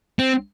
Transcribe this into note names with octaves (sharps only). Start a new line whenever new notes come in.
C4